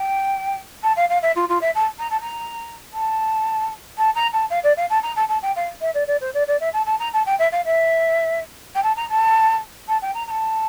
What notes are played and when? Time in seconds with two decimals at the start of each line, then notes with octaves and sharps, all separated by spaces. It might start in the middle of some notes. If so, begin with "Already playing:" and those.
Already playing: G5
0.83 A5
0.96 F5
1.09 F5
1.22 E5
1.35 F4
1.49 F4
1.61 E5
1.75 A5
1.99 A#5
2.10 A5
2.21 A#5
2.93 A5
3.98 A5
4.15 A#5
4.33 A5
4.50 F5
4.63 D5
4.77 F5
4.90 A5
5.03 A#5
5.16 A5
5.28 A5
5.42 G5
5.56 F5
5.81 E5
5.94 D5
6.07 D5
6.21 C5
6.34 D5
6.47 D5
6.60 E5
6.73 A5
6.86 A5
6.99 A#5
7.13 A5
7.26 G5
7.39 E5
7.52 F5
7.65 E5
8.75 G5
8.83 A5
8.96 A#5
9.09 A5
9.88 A5
10.02 G5
10.14 A#5
10.27 A#5
10.30 A5